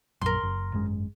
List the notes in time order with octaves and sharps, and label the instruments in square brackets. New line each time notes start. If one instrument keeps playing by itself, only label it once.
[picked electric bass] A#1 F#2 [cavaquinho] A#4 C6
[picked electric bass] F#1
G#1 F#2 G#3